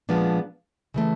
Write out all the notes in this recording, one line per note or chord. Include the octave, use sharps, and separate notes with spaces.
A#2 F3 G#3 B3 D4
C#3 E3 A3